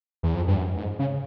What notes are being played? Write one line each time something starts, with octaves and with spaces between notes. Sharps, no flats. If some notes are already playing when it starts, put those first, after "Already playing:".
E2
F2
G2
F#2
G#2
C#3